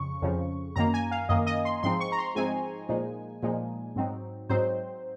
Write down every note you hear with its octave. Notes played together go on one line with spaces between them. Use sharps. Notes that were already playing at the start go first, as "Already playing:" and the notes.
Already playing: F2 C#3 C#6
F2 C#3 F3
F#2 D#3 A#3 A#5
G#5
F5
F#2 D#3 A#3 D#5
D#5
C6
G#2 F3 G#3 C4 D#4 C6
C#6
A#5
C6
G#2 F3 G#3 C4 D#4 G#5
A#2 F3 G#3 D#4
A#2 F3 G#3 D#4
G#2 F#3 C4 D#4
G#2 F#3 C4 D#4 C5